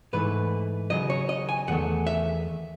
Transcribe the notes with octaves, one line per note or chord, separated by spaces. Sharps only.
G#2 E3 A3 B4
D#2 C#3 F#3 D#5
C#5
D#5
G#5
E2 D#3 A3 F#5
E5